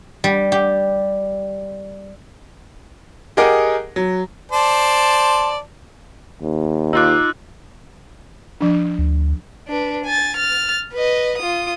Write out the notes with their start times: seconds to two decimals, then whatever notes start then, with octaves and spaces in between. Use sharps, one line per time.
0.24 G3
0.52 G4
3.37 G4 G#4 A#4 D#5 F#5 D6
3.96 F#3
4.52 C5 D5 A5
6.42 D#2
6.93 D#4 F4 D6 E6 F#6
8.61 F3 D4
8.98 D2
9.68 D4 B4
10.05 G#5 A6
10.37 F6 A6
10.93 B4 D#5
11.38 F4 D#6